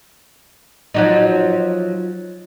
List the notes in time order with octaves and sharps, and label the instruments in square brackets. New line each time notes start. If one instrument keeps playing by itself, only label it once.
[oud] F3 F#3 D#4